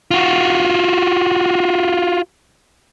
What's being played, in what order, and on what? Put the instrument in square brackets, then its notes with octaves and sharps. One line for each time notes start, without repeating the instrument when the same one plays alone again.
[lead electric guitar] F4 F#4